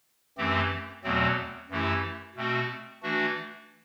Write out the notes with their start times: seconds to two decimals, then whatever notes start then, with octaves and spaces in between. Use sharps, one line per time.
0.38 F#2 E3 A3 C4 G4
1.04 E2 B2 F#3 A3 C4
1.70 F#2 E3 A3 E4 G4
2.36 B2 A3 C4 F#4
3.03 E3 A3 D4 F#4